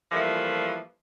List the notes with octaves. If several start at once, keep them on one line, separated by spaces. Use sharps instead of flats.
A#2 E3 F3 G3 A3